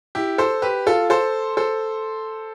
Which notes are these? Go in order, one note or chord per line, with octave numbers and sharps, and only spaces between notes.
E4 G4
A4 C5
G4 B4
F4 A4
A4 C5
A4 C5